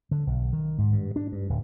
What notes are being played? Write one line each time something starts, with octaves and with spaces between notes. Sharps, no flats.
D3
B1
D#3
G#2
G2
D4
G2
D1